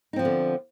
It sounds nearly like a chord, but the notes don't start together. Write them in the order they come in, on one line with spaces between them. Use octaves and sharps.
D#4 C4 F3 B3 D3